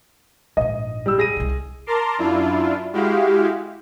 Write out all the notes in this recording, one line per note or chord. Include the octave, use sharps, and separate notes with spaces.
A#1 G#2 D#5
G3 E6
G#4 A#6 D#7
C2 C3
A#4 A5 A#5 C6 D6
F#2 D4 E4 F4
G#3 E4 F#4 G4 F5